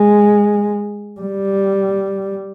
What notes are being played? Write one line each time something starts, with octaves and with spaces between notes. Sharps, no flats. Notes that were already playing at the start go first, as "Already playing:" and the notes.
Already playing: G#3
G3